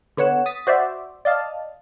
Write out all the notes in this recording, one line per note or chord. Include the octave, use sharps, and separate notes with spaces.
D3 B3 C#5 F#5 E7
D#6 A6 B6
F#4 C5 D5 E5
D5 D#5 F5 A5